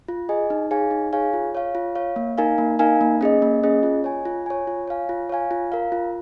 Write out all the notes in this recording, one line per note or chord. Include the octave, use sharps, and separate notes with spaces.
F4
G#4 D#5 G#5
D#4
G#4 C#5 F5 G#5
D#4
G#4 C#5 F5 G#5
F4
C#5 F5
F4
C#5 F5
A#3
D#4 A#4 F5 G#5
A#3
D#4 A#4 F5 G#5
A#3
C#4 G#4 D#5
A#3
C#4 G#4 D#5
F4
C#5 G#5
F4
C#5 G#5
F4
C#5 F5 G#5
F4
C#5 F5 G#5
F4
A#4 F5
F4